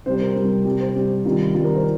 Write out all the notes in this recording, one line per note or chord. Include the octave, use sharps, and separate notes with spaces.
C3 G3 C5
A#4
C3 G3
C3 G3 G4
C5
C3 G3 G4
C3 D#3 G3 F4
C3 D#3 G3 F4
A#4
C5